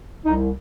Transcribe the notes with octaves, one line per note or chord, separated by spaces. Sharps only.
C2 D#4